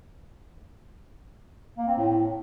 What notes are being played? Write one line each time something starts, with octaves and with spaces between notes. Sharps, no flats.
A#3
C4
A2